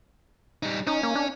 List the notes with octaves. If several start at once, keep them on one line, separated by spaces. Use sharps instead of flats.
G3 D#4
C#4 D#4
A#3
D4